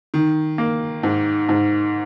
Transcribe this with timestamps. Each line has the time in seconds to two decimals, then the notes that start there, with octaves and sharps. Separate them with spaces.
0.14 D#3
0.58 A#3
1.03 G#2
1.49 G#2